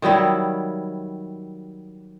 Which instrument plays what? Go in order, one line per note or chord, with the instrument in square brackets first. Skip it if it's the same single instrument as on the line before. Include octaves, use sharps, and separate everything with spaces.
[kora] D#3 F#3 G3 E4